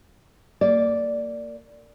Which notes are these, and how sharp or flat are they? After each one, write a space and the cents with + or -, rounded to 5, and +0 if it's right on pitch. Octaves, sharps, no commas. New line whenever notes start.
A#3 -25 D5 -5